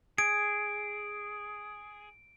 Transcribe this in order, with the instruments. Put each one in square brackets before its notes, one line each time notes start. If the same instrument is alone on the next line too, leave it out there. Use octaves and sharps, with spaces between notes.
[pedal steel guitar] G#4 [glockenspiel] D7